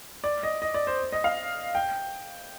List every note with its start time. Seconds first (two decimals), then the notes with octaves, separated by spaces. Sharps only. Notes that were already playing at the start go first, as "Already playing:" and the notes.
0.24 D5
0.43 D#5
0.62 D#5
0.74 D5
0.87 C5
1.12 D#5
1.24 F5
1.75 G5